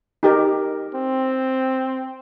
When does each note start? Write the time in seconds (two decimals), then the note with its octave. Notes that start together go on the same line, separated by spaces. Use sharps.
0.23 D#4 G4 A#4
0.94 C4